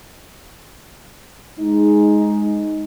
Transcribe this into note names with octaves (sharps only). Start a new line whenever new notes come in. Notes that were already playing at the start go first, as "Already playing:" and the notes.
G#3 D#4